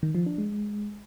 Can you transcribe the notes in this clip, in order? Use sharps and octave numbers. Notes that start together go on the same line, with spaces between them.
D#3
F3
D4
G#3